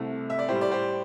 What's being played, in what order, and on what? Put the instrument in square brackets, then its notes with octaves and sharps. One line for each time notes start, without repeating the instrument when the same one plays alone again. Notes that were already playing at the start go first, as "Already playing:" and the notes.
Already playing: [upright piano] C2 C3 A3
E5
D5
A2 G3 G4 C5
D5
G4 C5